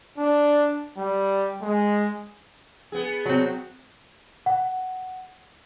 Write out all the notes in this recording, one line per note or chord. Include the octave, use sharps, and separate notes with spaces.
D4
G3
G#3
B3 G#4
F#3 C4
F#5